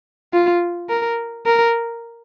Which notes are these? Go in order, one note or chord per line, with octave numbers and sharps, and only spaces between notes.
F4
A#4
A#4